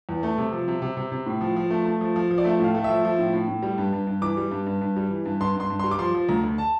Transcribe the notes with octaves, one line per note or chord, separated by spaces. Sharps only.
E2
A3
C3
F3
C3
C3
C3
C3
A2
F3
F3
A3
A3
F3
F3
F3
D5
A3 E5
A2
F5
A3
F3 E5
F3
A2
A2
A2
G3
G2
G2
G2
E3 D6
G3
G2
G2
G2
G3
E3
G2
G2 C6
G2
C6
G2
C6
G3
D6
F3 C6
F3
D2 A#5
D2
A5